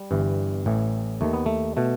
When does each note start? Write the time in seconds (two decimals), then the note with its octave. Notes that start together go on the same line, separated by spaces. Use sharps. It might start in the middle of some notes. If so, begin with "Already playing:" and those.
Already playing: G3
0.11 G1 G2 E3
0.66 A1 A2 E3
1.21 D#2 D#3 A3
1.33 B3
1.46 A3
1.77 B2 A3